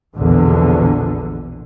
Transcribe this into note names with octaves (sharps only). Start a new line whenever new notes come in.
A#1 E2 B2 D3